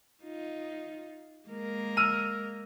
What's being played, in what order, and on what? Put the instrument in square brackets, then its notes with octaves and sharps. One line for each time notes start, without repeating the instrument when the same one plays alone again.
[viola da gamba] D#4 F4
G#3 A#3 A#4
[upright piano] E6 F6 D#7